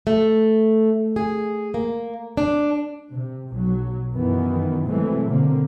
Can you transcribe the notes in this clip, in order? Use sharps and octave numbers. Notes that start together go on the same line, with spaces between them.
A3
G#4
A#3
D4
C3
B1 F#3
F#2 D#3 E3 B3
C3 E3 F#3 G#3 A3 C4
B2 D3 A#3 C4